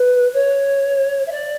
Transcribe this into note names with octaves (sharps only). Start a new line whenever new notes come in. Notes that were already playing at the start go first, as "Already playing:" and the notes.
Already playing: B4
C#5
E5
D5